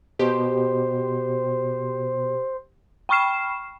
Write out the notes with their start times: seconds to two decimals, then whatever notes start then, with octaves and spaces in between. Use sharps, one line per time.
0.19 B2 G4 C5
3.09 G5 B5 C#6 F6 C7 E7